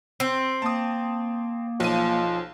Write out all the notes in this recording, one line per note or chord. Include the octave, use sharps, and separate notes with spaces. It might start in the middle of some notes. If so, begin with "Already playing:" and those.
C4 E6
A#3 A5 D#6
B1 F3 D#7